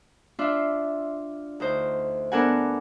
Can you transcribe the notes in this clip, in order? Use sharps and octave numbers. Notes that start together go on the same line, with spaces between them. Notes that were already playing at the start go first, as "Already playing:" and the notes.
D4 F4 E5 C6
D2 D#4 C5
B3 D4 A4 A#4 F#5 G#5